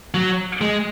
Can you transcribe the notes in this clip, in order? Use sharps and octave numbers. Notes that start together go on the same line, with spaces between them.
F#3
G#3